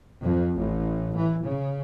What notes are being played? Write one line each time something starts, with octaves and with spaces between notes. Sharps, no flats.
F2
A1
E3
C#3